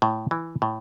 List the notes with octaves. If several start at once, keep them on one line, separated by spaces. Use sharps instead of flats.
A2
E3
A2